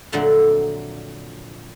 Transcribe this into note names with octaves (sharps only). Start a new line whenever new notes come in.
F2 A#2 D3 F#3 A3 F#5